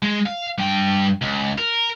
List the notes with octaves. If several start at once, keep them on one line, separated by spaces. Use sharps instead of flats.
G#3
F5
G2 G5
C#2
A#4